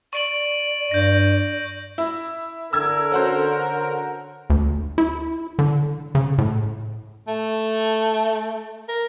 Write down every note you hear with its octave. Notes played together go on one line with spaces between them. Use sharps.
D5 C#6 D7 F#7
G2 G6 A#6
E4
D3 A#4 E6 G#6
C#4 F#4 C5
D2
E4
D3
C#3
A2
A3
A#4